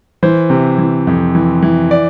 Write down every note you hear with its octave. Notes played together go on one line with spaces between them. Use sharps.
E3 C5
C3
E3
F2
E3
E3
D5